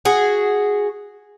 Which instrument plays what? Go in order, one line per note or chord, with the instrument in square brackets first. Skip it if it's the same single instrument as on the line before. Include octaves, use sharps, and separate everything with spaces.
[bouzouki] F#4 G#4